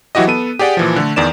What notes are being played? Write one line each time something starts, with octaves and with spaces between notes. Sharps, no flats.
E3 F#3 E4 F#4 G4 D#5
B3 A4 D#7
G4 G#4 D5 F#5 G5
A#2 E3 F3
D3 A3
E2 D#3 D5 E7